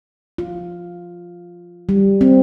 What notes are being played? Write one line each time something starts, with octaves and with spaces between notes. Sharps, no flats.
F4
G3
C4